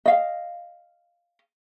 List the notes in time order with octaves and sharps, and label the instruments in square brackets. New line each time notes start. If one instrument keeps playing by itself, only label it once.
[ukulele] D#5 F5